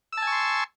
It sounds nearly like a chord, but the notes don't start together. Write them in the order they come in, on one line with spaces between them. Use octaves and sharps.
E6 A5 G#5 C#6 C6